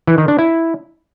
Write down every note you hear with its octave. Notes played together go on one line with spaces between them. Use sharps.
E3
D#3
D4
E4